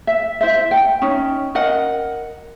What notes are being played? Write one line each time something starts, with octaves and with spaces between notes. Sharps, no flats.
E5
E4 C5 E5
G5
C#4 D#4
A#4 D#5 F#5